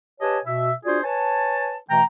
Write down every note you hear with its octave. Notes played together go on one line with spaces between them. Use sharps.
G4 B4 C#5 D#5 G#5 A5
B2 E5
D4 F4 F#4 G#4 C5 D5
B4 C#5 G#5 A5
B2 E3 A3 G5 A#5